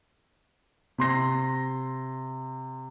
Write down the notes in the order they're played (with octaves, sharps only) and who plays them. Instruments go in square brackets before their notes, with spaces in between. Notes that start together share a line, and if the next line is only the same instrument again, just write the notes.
[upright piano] C3 C6 A#6